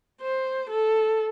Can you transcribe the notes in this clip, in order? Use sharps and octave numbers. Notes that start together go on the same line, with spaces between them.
C5
A4